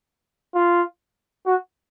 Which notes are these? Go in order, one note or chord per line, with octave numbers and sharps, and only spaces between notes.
F4
F#4